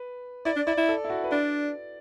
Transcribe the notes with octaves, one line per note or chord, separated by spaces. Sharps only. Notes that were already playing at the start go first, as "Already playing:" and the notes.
Already playing: B4
E4 D5
D4
E4 D5
E4
A4
E4
F#4
B4
D4 D5